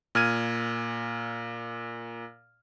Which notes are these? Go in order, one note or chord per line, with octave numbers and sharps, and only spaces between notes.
A#2 F6 G#6 D#7